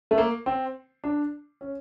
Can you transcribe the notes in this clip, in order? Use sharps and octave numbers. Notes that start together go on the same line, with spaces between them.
A3
A#3
C4
D4
C#4